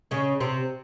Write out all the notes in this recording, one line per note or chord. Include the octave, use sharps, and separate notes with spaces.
C#3 C#4
C3 C4